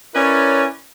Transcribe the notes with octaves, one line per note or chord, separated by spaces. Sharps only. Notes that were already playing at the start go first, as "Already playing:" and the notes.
C#4 E4 A#4 B4 C#5 D5